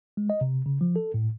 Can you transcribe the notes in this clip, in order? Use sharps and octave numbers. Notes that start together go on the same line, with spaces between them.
G#3
D#5
C3
C#3
F3
A4
A2